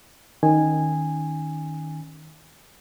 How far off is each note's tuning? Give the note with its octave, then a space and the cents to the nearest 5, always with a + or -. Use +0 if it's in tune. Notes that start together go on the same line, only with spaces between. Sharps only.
D#3 +0 C#4 +0 G#5 -10